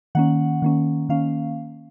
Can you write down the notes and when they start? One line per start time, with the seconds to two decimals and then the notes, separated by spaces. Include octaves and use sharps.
0.15 D#3 A#3 C#4 F#5
0.62 D#3 A#3 C#4
1.09 D#3 A#3 C#4 F5